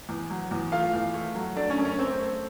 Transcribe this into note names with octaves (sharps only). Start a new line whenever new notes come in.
E2
F#3
E2
A3 F4 F5
E2
A3
F#3
A3 D4 D5
C#4 C#5
F#2
C#4 C#5
A3 C4 C5
A3